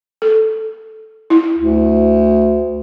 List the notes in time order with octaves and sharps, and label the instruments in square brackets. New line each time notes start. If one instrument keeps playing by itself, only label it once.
[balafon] A4
E4
[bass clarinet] D2